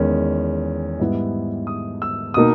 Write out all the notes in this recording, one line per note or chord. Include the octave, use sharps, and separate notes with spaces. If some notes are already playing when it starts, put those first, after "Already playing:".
Already playing: E2 D#3 G#3 C#4
G#2 G3 B3 E4
D#6
E6
B2 A#3 D#4 D#6